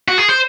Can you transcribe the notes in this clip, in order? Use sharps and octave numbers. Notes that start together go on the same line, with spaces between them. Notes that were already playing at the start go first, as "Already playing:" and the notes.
F#4
G#4
C5